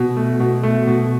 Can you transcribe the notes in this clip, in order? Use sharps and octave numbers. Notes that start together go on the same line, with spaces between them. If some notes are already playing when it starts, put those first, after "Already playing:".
Already playing: B2
A3
B2
A3
B2